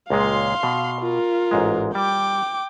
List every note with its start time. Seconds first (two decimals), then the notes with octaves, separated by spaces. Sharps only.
0.10 C#2 A#2 G#3 F5 C6
0.63 B2
1.01 F4 A#4
1.51 A1 G#2 G#3
1.95 G3 G5 D6